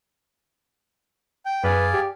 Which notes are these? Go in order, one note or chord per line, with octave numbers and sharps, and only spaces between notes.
G5
F#2 G#4 B4 D5 F5
G4